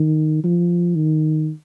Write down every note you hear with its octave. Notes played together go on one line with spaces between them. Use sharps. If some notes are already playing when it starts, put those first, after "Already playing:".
Already playing: D#3
F3
D#3